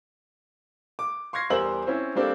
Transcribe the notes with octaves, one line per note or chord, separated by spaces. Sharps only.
D6
C6 C#6 F6 G#6 A#6 C7
E2 G3 A#4 C5 E6 F#7
C4 C#4 E4
G3 A#3 C4 D4 A4